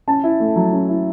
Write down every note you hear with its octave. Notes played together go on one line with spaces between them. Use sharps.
C#4 A5
E4
A3
F#3
C#4
E4